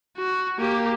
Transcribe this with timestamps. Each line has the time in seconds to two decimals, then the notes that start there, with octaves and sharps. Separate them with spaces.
0.17 F#4
0.59 A#3 G4